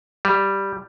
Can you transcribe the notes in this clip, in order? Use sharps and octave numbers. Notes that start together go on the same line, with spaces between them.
G3